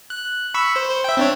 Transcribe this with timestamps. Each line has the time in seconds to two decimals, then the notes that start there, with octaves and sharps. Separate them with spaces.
0.10 F#6
0.54 B5 C#6 E6
0.76 C5
0.89 C5
1.04 E5 G5
1.17 C4 D4 C#5